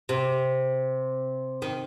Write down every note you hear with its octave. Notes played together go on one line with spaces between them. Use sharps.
C3
D#3